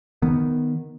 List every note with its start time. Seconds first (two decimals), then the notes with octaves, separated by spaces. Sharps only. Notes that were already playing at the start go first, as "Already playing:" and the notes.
0.22 D#3 B3